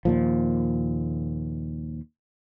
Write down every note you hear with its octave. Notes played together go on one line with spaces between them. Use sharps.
D#2 A#2 F3